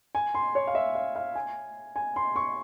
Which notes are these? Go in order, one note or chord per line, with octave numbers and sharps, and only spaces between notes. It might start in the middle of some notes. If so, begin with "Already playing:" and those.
G#5
C6
C#5
F5
E5
F5
F5
G#5
G#5
C6
C#6